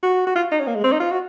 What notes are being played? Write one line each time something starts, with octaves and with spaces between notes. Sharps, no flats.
F#4
F#4
F4
D#4
C#4
A#3
G#3
C4
D#4
F4
F#4